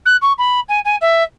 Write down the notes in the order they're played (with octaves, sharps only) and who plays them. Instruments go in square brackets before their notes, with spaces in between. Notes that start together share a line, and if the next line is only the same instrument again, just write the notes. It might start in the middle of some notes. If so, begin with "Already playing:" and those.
[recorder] F#6
C#6
B5
G#5
G#5
E5